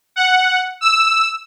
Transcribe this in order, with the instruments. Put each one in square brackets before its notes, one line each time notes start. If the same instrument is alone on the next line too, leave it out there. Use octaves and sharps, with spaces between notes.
[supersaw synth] F#5
E6